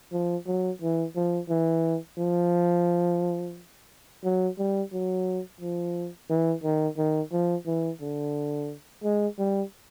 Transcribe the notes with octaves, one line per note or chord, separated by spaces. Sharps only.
F3
F#3
E3
F3
E3
F3
F#3
G3
F#3
F3
E3
D#3
D#3
F3
E3
D3
G#3
G3